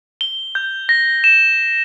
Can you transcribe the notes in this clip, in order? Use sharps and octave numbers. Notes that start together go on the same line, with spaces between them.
G7
G6
A#6
E7